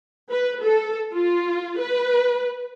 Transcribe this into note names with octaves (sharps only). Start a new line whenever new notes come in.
B4
A4
F4
B4